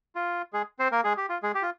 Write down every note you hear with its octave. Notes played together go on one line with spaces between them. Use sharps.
F4
G#3 G#4
C4 C5
A#3 A#4
G#3 G#4
G4
F4
G#3 G#4
G4
F4